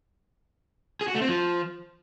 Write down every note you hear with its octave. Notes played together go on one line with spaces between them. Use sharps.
G#4
F#4
A3
C4
F3